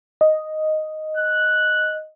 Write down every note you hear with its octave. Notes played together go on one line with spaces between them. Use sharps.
D#5
F#6